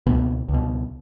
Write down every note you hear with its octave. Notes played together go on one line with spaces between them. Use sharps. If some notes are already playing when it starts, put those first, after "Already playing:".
C#2 B2 B3
C#2 B2